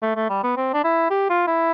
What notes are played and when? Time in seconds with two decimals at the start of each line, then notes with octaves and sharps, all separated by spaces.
0.02 A3
0.16 A3
0.29 G3
0.43 B3
0.57 C4
0.73 D4
0.84 E4
1.10 G4
1.30 F4
1.47 E4